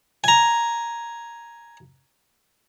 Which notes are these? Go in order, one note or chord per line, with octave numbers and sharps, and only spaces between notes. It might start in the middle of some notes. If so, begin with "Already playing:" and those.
G#5 A#5